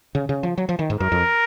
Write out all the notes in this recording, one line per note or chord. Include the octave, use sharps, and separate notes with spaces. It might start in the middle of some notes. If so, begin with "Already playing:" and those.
C#3
C#3
F3
F#3
F3
D#3
G#2
F#2 A#4
F2